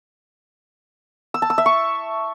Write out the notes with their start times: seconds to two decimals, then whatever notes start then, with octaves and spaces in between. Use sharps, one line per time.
1.34 E6
1.42 A5
1.50 E6
1.58 E5
1.66 C#6